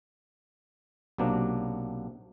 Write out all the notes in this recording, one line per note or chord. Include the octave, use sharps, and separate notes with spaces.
B1 C3 F#3 A#3 D4